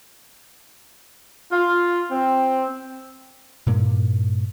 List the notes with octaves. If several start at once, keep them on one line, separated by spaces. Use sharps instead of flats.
F4
C4
G2 A#2 A#3